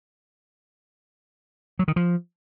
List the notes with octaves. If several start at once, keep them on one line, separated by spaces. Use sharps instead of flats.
F#3
D#3
F3